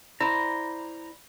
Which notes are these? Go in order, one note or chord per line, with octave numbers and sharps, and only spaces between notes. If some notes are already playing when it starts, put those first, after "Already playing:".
E4 C5 D5 A#5